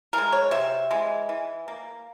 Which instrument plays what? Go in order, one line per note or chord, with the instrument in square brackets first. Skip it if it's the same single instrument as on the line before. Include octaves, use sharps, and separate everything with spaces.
[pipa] E3 G#3 A#4
C#5
C3 E5
E3 G#3
E3
A#3